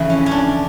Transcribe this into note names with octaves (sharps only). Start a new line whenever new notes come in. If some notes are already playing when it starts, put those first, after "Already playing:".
Already playing: F2 C#3 E3
C#4
C#4
D4